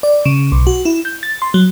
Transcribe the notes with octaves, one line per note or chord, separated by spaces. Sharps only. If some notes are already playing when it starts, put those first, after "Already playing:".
D5
C#3
B1
F#4
E4
G6
A6
C6
F#3